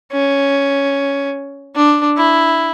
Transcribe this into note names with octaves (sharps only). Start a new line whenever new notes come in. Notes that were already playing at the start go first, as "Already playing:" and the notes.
C#4
D4
E4